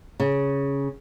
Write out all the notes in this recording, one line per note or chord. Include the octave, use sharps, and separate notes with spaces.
C#3